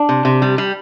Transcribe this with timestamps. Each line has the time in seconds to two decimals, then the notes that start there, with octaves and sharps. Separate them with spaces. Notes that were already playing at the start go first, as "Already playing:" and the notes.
Already playing: D4
0.09 C3
0.25 C3
0.42 G3
0.58 G3